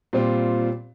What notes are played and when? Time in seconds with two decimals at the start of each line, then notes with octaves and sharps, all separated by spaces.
0.13 A#2 G3 C4 F4